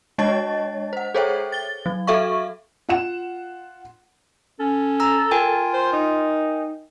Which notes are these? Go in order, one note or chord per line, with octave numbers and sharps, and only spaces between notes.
G#3 D4 C#5 D#5 A5 A6
C5 F#5
G#4 A4 C5 C#5 E5 G5
A6 G7
F#3
F#4 A4 E5 F5 C#6
F4 F#5 E7
C#4 A4
A#5 E6
F4 A#4 G5 G#5
C5
D#4